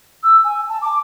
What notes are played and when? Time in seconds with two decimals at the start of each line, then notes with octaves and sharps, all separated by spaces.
0.23 E6
0.44 G#5
0.69 A5
0.82 D6